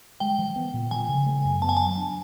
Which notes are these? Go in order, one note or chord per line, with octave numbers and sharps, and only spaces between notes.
G#3 G5
F3
B3
A#2
F3 G#5
C#3
A3
F#2
B3 A5
G#5
F#3 A5
D4